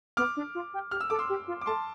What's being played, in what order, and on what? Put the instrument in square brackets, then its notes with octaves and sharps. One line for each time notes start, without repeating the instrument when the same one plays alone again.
[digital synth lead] B3 [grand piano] D6 F6
[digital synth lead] D4
F4
G4
[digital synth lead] G4 [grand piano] F6
[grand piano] E6
[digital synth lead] A4 [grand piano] D6
[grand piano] C6 E6
[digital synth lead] G4
F4
[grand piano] D6
[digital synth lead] A3 [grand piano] A5 C6